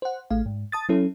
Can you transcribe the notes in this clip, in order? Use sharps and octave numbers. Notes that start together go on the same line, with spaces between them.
C5 F#5
A1 A3 F5
G#2
A5 D#6 A6
F#3 C#4 E4 A4